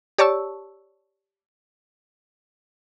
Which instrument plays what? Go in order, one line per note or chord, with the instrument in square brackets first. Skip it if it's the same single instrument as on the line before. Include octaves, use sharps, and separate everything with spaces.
[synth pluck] G4 C#5 D5 A5 C#6 E6